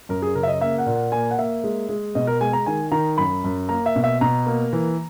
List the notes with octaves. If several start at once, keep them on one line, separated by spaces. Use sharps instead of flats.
F#2 A#4
G#4
C#3 A#4
E5
D#5
A#3 E5
F#5
A#2
F#5
A#3 G#5
F#5
A#3 E5
G#3
G#3
B2 D#5
A#4
G#3 G#5
A#5
D#3 G#5
D#3 A#5
F#2 B5
F#2
A#3 A#5
E5
B2
E5
B2 A#5
A#3
E3